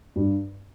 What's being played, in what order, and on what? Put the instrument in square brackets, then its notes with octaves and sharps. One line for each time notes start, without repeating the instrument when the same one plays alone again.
[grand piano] G2